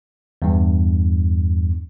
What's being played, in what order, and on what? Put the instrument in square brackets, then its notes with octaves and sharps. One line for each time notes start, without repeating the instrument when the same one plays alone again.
[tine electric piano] E2 G2